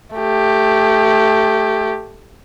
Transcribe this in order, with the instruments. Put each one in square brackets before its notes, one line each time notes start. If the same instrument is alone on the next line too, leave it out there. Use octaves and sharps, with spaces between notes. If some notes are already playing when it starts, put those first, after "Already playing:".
[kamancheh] A3 G4